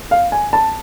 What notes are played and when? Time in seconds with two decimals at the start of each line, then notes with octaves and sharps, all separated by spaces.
0.11 F5
0.32 G#5
0.53 A5